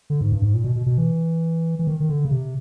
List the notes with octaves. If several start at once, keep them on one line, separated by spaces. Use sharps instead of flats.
D3
G#2
G2
G#2
A#2
B2
B2
B2
E3
E3
D#3
D#3
D3
C#3
C3